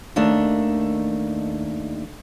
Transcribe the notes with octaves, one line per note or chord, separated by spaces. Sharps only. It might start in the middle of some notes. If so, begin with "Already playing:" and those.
D#2 D#3 A3 D4